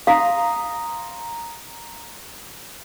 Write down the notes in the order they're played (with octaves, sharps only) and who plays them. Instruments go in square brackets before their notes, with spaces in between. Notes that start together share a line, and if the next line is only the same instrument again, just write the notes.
[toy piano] F5 [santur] A#5 C6 D#6